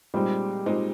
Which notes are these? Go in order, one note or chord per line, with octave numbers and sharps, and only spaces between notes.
A#2 G3 G#3 C4 D#4
A#2 G#3 C4 D#4